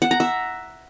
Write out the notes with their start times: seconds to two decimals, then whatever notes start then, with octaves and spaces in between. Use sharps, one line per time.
0.02 F#5
0.11 A#5
0.20 E5